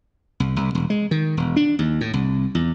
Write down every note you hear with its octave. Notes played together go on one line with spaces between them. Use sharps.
C2
C2
E1
G#3
D#3
E1
D4
D#2
A2
C2
E2